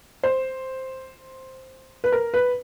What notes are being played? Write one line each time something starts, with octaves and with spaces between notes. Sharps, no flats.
C5
B4
A#4
B4